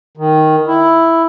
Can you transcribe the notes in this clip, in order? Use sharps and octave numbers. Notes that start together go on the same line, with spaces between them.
D#3
E4